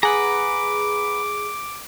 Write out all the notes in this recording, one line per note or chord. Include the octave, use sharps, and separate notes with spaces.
G#4 B4 F#5 A#5 D6